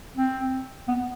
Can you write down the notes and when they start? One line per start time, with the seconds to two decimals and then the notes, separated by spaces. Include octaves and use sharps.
0.17 C4
0.88 B3